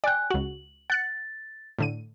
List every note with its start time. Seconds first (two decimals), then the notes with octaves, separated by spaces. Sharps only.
0.04 D5 G5 G#5 F#6
0.30 C#2 F#4 F#7
0.90 F#5 F#6 A6 C#7
1.79 A2 D3 D#7